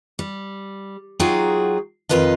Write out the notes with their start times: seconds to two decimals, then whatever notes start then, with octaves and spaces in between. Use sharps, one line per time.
0.19 G3
1.20 F#3 D#4 F4 F#4 G#4 G5
2.09 F2 D#3 F4 B4 D#5